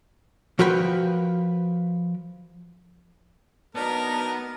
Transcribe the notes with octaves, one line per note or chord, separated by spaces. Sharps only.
F3 F#4 A#4 B4 G5 B5
F#3 B3 D4 D#4 A#4 A5